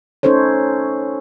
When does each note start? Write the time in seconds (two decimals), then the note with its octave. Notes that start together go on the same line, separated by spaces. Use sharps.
0.23 C#4 D#4 A4 C5 C#5